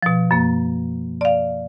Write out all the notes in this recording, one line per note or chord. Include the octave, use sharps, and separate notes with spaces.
B2 F3
F#2 A#3
D5 F5